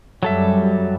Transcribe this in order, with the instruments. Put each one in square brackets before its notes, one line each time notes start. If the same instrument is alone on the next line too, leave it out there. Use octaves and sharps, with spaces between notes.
[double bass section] F#2 G3 [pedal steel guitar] F#3 A4 E5